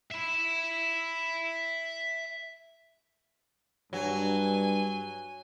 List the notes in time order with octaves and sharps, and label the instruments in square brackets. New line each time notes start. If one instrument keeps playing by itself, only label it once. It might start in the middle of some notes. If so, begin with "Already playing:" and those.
[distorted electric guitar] E5 B5
[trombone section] G2 [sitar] F#3 [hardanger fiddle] G#5